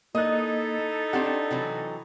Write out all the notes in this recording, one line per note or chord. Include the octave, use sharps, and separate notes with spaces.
A#3 D#4 E4 A4 D#5 F#6
C4 D4 G4 F#5
C3 E3 F#3